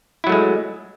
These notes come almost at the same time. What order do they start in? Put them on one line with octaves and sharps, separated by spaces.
E4 F#3 A3 G#3